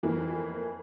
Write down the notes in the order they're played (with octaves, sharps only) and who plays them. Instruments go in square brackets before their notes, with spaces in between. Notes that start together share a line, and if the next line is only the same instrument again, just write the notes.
[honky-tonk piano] F2 E3 A#3